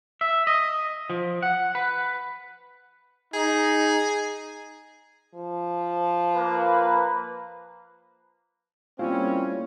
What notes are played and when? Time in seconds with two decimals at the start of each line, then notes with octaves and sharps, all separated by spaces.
0.21 E5
0.47 D#5
1.10 F3
1.43 F#5
1.75 B4
3.34 D#4 G#4
5.35 F3
6.35 A#3 B4
8.99 A2 G3 A#3 C4 C#4 F4 C#5 F5